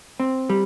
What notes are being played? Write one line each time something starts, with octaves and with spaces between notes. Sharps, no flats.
C4
G3